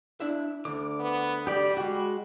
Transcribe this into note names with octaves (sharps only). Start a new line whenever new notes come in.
D4 E4 E5
D2 D3 D6
B3
G3 G4 D5
G#3 F#4